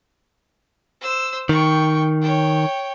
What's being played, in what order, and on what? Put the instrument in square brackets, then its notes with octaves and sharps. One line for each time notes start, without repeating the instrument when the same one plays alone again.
[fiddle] C5 E6
[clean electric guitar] D#3 [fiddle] G5 C#6
[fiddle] C#5 G5